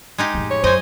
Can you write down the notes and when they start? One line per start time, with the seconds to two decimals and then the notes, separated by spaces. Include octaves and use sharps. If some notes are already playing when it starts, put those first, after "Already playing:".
0.18 G#3 D#4 G4
0.34 F2 A2
0.51 C#5
0.64 F#2 C5 D#5 G#5